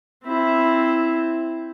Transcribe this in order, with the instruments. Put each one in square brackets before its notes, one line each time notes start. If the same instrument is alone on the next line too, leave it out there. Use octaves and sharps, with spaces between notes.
[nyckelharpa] C4 E4